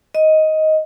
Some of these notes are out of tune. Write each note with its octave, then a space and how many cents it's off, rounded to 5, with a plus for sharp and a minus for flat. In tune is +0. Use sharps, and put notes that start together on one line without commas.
D#5 +10